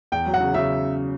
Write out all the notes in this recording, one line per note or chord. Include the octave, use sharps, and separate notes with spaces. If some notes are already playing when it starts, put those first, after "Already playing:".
E2 G5
F#3
F#5
C#3
C#3 E5